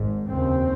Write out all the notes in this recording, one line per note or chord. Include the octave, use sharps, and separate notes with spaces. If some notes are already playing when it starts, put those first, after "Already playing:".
Already playing: G#1 G#2
F1 D#2 C#3 C4